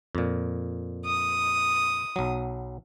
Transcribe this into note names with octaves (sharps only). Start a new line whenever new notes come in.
F2 A#2
D#6
B1 F#3